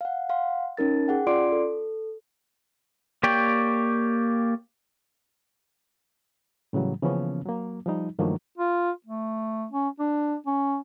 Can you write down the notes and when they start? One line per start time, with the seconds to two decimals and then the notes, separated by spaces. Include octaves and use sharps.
0.01 F5 F#5
0.29 F5 F#5 C6
0.77 C#4 D#4 A#4 A6
1.08 G#4 F#5 G5
1.27 C#4 F4 D5 C6 D6 D7
1.52 A4
3.23 A#3 G4 C#5 D5 G5
6.73 A2 C#3 E3 F#3 G3
7.02 C#3 E3 F3 A#3 B3 C#4
7.46 F#3 A#3
7.86 F3 G3 D#4
8.19 G2 D#3 F3 F#3 A3 A#3
8.58 F4
9.06 A3
9.71 C#4
9.99 D4
10.46 C#4